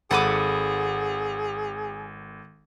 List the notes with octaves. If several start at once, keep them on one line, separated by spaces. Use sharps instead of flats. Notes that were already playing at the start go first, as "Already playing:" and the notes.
G#1 G#4 A4 F#5 B5 D6 D#7